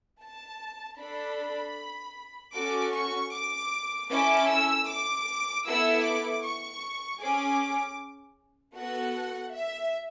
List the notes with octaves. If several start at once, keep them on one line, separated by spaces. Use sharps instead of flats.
A5
D4 A4 B5
C#4 F#4 A4 D6
C#6
D6
C#4 E4 A4 D6
E6
D6
B3 E4 A4 E6
D6
C#6
C#4 G#4 D6
B3 F#4 A4 F#5
E5